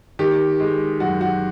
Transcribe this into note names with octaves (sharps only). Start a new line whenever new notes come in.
D#3 G4
G#3
F#2 F#4
F#4